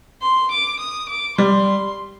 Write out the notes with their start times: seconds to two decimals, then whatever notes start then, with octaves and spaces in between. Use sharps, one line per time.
0.22 C6
0.51 D6
0.80 D#6
1.09 D6
1.38 G3 C6